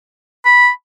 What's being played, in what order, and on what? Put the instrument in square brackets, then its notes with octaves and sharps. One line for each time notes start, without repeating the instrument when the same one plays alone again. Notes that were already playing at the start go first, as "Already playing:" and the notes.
[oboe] B5